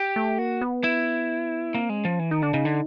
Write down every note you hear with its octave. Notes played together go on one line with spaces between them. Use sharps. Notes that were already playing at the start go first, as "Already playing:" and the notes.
Already playing: G4
A3
A#3 F#4
B3
E4
A#3 C4
G#3
C#4
F3
E3
D#3 D#4
D3 D4
C#3 D#4
D3